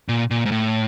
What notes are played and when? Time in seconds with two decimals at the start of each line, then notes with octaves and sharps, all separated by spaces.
0.09 A#2
0.31 A#2
0.46 G#2
0.52 A2